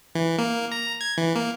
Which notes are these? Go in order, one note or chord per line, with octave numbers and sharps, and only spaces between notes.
E3
A#3
A#5
G#6
E3
A#3